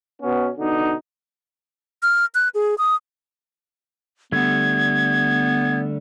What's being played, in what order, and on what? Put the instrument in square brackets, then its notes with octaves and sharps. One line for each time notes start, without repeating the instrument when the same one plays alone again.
[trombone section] B2 B3 C#4
B2 D3 D#4
[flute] F6
F#6
G#4
D#6
[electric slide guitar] D3 G3 A3 [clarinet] B3 [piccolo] G#6